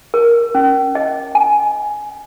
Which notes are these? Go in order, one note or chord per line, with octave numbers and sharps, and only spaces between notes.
A#4
C#4
D#5
G#5